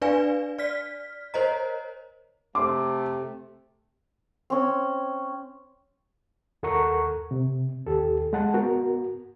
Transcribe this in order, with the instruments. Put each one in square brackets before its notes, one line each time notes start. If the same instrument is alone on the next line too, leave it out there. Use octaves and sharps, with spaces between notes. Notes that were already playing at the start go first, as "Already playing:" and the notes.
[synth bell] D4 B4 D5 F5 G#5
D5 F6 B6
A#4 C5 C#5 D#5 A#5
[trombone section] C3 A3 [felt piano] C6 D6
[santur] C4 C#4
[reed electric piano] D#2 A4 A#4 F#5 A#5 C#6
C3
D#2 G4 A4
G#3 F#5 A5
B3 F#4 A#4